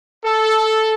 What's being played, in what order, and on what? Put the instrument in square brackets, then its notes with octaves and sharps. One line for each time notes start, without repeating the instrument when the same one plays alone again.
[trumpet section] A4